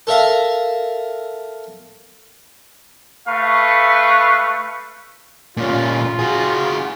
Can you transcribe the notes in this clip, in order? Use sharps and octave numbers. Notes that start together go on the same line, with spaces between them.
A4 A#4 E5 F5
A3 B4 F5 C#6
A#2 C#4 F4
F#4 G#4